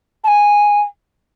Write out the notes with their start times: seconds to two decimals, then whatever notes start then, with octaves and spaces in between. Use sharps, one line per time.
0.24 A5
0.28 G#5